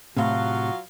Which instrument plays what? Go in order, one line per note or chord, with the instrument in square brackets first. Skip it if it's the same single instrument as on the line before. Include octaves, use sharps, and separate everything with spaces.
[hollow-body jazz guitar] A2 C3 [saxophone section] F#3 F4 F5 [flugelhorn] F#4